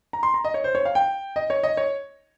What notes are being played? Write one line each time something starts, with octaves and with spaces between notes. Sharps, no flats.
A#5
C6
A#5
D#5
C#5
C5
C#5
F5
G5
D#5
C#5
D#5
C#5